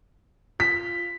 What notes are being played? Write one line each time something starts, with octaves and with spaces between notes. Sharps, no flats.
F4 B6